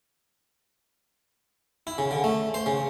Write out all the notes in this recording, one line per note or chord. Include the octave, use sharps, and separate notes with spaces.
E4
C#3
D3
A3
C5
C#3